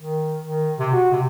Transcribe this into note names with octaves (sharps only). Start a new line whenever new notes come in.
D#3
D#3
C3
F#4
C3